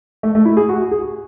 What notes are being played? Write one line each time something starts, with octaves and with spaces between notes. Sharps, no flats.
A3
A3
E4
G#4
F#4
G#4